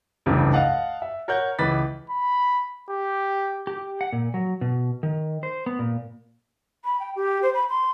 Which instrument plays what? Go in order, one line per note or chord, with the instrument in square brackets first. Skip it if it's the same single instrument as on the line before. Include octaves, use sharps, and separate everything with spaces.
[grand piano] F1 C#2 G2 C#3 E3
D#5 F5 F#5 A5
E5
A#4 C#5 F#5 G6
C#2 E3 B4 A6 B6
[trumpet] B5
G4
[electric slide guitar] G4
F#5
A#2
F#3
B2
D#3
C5
B3
A#2
[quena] B5
G5
G4
C5
B5
C6